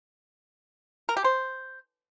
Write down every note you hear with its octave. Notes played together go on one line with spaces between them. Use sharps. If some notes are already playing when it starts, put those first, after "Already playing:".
A#4
G4
C5